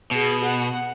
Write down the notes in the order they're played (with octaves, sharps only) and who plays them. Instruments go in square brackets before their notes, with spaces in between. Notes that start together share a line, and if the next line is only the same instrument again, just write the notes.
[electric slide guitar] B2 [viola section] G#4
[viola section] F#5